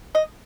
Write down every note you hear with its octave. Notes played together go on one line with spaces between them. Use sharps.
D#5